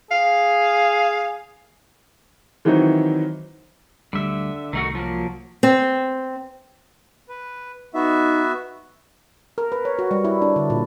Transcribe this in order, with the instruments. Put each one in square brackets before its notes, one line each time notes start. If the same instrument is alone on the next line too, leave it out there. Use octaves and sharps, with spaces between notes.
[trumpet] G#4 [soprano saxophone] F5
[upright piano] D#3 E3 F#3 C4 D#4
[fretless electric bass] D2 G3 [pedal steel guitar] D3 E5
[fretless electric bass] C2 [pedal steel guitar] D#3 A3 F#4
[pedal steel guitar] F3 F#3 A#3
[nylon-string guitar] C4
[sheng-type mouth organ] B4
[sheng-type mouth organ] B3 F#4 E5 [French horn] D#4
[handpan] A#4
B4
C#5
F#4
G3
E4
D4
D3
A#2